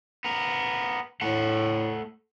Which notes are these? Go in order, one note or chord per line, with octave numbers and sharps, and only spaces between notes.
B3 A#4
A2 A3 F#5